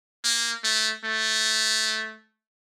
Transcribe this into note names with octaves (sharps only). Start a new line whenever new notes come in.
A#3
A3
A3